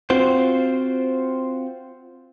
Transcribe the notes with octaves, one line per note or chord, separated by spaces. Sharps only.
C4 F4 F#4 C5